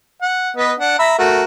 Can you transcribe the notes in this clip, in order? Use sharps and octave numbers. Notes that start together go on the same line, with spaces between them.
F#5
B3 B4 D#5
D4 F#5
E5 A#5 B5
A3 F#4 A#4